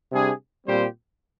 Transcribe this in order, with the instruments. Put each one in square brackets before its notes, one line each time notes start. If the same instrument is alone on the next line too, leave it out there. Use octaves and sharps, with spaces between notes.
[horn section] C3 G3 D4 G#4
A#2 G3 C4 G4 C5